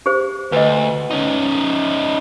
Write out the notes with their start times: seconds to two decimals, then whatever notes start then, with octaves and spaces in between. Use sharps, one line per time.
0.06 G4 G#4 C5
0.52 D2 B4 D#5
1.11 C#4 D#4